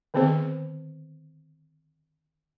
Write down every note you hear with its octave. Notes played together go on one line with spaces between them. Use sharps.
D3 D#3 B3 C4 G#4 C5